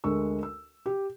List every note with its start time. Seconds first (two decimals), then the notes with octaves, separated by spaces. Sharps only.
0.04 D2 G#3 A#4 C#6 E6
0.43 E6
0.86 G4